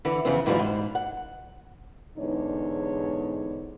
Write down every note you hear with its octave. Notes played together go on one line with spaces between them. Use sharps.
D3 E3
F2 C#3 E3 B3 C4
G#2 D3 E3 F#3 G3 F4
G#2
F#5
E2 G#2 D3 D4 D#4 C#5